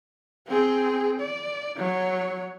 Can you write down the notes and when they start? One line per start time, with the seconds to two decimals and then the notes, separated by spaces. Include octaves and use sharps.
0.48 C4 G#4
1.21 D5
1.77 F#3 C#5